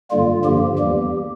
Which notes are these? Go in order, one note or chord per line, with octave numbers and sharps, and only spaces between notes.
G2 D3 G3 A#3 F4
G2 D3 F3 A#3 G4
E2 E3 G3 A#3